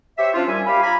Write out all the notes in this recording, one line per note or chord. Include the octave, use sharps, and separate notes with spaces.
G4 C5 C#5 E5
F3 C#4 D4 F4
D#2 G3 E5 G#5
G4 F5 B5
F4 G#5 A#5 B5